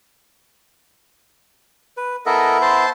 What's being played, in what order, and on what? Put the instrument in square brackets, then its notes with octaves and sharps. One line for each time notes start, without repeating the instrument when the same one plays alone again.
[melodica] B4
[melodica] B3 E4 E5 [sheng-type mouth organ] A4 A#4 D#5
[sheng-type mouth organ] C5 A5 C6